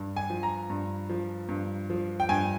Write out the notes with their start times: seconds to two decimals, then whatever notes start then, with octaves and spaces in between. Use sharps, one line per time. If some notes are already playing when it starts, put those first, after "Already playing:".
Already playing: G2
0.16 G#5
0.30 F3
0.43 A#5
0.70 G2
1.09 F3
1.49 G2
1.90 F3
2.20 G5
2.29 G2 G#5